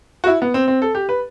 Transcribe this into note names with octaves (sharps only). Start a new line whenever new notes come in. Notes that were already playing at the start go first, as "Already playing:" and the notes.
F#4
E4
B3
C4
C4
A4
G4
B4